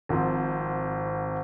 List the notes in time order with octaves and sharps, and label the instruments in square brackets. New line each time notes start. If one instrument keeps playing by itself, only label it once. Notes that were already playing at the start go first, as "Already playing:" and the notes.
[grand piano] G#1 G#2 F3 C4